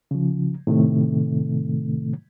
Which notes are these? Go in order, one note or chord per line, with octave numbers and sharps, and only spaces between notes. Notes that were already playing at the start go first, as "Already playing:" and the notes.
C#3 F3
A2 C3 D#3 A3